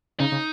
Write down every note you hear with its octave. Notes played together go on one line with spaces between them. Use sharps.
C#3 D#4
C#3